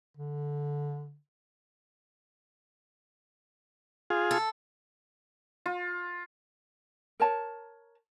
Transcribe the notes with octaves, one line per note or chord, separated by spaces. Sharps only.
D3
F4 G#4
A4
F4
A#4 C#5 A5